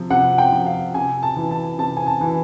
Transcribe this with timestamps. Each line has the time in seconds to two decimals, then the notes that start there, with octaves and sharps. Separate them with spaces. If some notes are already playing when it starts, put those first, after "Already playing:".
Already playing: C3 F3
0.10 C3 F#5
0.38 G5
0.52 F3
0.66 F5
0.94 C3 G#5
1.23 A5
1.36 E3
1.51 A5
1.79 C3 A5
1.97 G#5
2.06 A5
2.21 E3